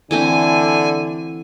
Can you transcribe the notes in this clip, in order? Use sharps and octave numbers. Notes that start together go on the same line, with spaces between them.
D3 E3 A3 C4 G#5